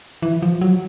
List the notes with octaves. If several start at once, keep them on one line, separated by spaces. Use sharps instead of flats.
E3
F3
F#3